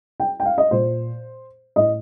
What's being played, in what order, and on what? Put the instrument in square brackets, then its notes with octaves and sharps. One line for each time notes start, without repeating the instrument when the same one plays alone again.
[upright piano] G5
G5
F5
D#5
A#2 C5
A2 D#5